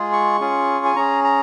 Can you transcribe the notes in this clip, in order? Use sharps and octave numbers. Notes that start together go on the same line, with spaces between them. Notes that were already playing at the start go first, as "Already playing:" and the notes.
Already playing: G#3 F4 G#4
C#6
C#4 F4 G#4
G#5
C#4 G#4 A#5
A#5